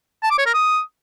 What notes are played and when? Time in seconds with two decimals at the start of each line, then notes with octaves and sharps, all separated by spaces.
0.23 A5
0.31 D6
0.38 C#5
0.46 A#4
0.54 D#6